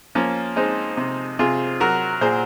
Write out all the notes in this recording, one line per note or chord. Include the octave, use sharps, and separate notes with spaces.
F3 A#3 C#4
G#3 C4 D#4
C3
C3 F4 G#4
F#3 F#4 A#4
A#2 G#4 C5